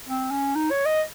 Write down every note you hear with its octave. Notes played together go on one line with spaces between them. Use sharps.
C4
C#4
D#4
C#5
D#5